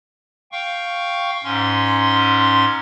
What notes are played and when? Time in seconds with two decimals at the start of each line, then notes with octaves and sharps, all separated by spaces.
0.52 F5 G5 C#6
1.44 G#2 C#4 C6